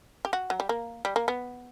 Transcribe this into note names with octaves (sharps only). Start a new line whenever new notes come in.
G4
F#4
F#3
G3
A#3
G3
A#3
B3